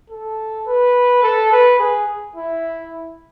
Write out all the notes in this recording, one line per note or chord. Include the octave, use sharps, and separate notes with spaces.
A4
B4
A4
B4
G#4
E4